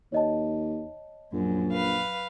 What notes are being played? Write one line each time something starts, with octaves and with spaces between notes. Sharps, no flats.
D#2 C#5 D#5 A5
A#1 F#2
B4 F5